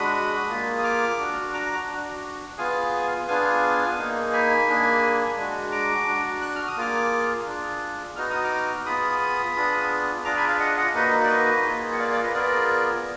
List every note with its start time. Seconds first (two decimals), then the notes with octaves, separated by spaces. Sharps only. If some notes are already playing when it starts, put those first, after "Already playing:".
Already playing: G#3 D4 F#4 B5 D#6
0.49 A#3 F4 G#4
0.78 D#6
0.84 D6 F6
1.19 D4 F#4
1.54 A#5 D6
1.89 D4 F#4
2.58 B3 F4 G#4 F5 G#5
3.28 B3 D4 F4 G#4 F5 G#5
3.98 A#3 D#4 G#4
4.33 G#5 B5
4.68 A#3 D4 G#4
5.37 G#3 D4 F#4
5.72 A#5 D6
6.07 D4 F#4
6.42 F#6
6.55 F6
6.68 D#6
6.77 A#3 F4 G#4 D6 F6
7.46 D4 F4 G#4
8.16 B3 D#4 F#4 F6
8.30 D#6
8.44 D6 F6
8.86 B3 F4 G#4 B5 D#6
9.56 B3 D4 F4 G#4
10.25 D4 F4 G#4 A#5 D6
10.37 G#5 B5
10.48 D5 F5
10.60 D#5 F#5
10.77 D#5 F#5
10.95 A#3 D#4 F#4 B4 D#5
11.24 D5
11.30 B4 D#5
11.65 A#3 F4 G#4
11.93 F#5
11.99 D5 F5
12.11 D5 F5
12.23 B4 D#5
12.34 B3 F4 G#4 A#4 D5